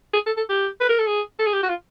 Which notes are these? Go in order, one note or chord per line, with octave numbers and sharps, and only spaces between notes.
G#4
A4
A4
G4
B4
A#4
A4
G#4
A4
G#4
G4
F#4
F4